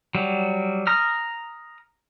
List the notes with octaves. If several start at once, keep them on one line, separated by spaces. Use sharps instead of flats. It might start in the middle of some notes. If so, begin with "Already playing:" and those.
F#3 G3
A#5 D#6 F6